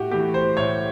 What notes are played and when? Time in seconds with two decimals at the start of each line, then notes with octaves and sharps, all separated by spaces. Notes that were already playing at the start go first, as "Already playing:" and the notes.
Already playing: A2 F#4 G4
0.11 E3 A3 G4
0.34 C5
0.57 A2 C#5